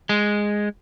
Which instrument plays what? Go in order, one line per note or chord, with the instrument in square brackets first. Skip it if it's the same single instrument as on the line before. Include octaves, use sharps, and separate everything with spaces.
[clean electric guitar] G#3